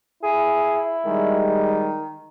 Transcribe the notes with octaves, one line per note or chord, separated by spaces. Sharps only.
E4 G#4
D#3 G3 G#3